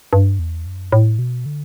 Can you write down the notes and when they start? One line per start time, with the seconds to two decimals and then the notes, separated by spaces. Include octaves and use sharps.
0.13 G2
0.39 E2
0.66 F#2
0.92 A2
1.19 B2
1.46 D3